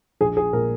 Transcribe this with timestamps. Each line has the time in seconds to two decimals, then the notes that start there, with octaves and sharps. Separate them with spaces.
0.21 A#1 G#4
0.37 G#4
0.53 A#2 A#4